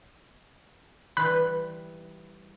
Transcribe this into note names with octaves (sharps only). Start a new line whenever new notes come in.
E3 G3 B5 F#6